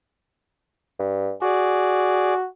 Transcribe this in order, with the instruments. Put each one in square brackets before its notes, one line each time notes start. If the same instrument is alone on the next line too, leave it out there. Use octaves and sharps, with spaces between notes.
[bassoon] G2
[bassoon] F#4 [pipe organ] G#4 D5